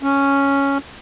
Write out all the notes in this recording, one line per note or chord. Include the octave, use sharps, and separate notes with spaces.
C#4